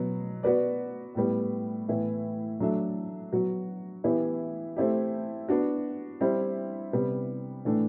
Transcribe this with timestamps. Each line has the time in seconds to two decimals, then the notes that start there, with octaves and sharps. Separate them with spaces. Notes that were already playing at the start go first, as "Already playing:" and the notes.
Already playing: B2 F#3 B3
0.43 B3 F#4 B4 D5
1.15 A2 G3 B3
1.88 A2 E3 B3 E4 B4
2.60 F#3 A3 D4 A4 E5
3.32 F#3 B3 F#4
4.04 E3 B3 E4 G4
4.76 A3 C4 E4 G4
5.48 B3 D4 F#4
6.21 G3 C4 E4
6.93 C3 G3 B3
7.65 A2 E3 A3 D4